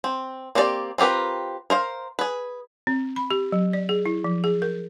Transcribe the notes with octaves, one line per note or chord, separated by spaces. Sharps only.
C4
A#3 C4 D4 G4 D5
C4 F4 G4 A#4 B4
A#4 C5 F5
G#4 B4
C4
B5
G4
F#3
D5
G#4
E4
F3
G#4
A#4